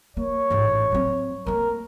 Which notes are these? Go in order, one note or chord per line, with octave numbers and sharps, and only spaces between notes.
A#3 C#5
A1 G#2
F#3 C4
A3 A#3 A#4